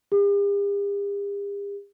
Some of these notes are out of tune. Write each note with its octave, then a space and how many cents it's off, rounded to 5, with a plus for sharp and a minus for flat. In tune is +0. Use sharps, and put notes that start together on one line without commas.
G4 +45